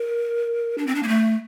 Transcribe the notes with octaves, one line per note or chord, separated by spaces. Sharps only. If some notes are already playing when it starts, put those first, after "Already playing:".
Already playing: A#4
D4
C4
D4
A#3
A3